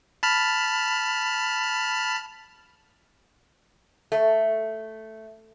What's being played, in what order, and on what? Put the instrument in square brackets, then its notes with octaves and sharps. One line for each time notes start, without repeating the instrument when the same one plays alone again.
[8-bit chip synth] A5 B5 F6
[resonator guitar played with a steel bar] A3